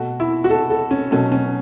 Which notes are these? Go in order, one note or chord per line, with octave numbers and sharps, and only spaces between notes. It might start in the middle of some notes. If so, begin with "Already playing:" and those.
Already playing: B2 A3 F#4
E4
F#4
A4
A4
C#4
B2 F#3 A3 C#4
C#4